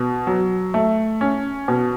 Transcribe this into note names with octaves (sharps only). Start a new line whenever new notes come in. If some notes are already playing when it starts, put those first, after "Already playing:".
Already playing: B2
F#3
A3
C#4
B2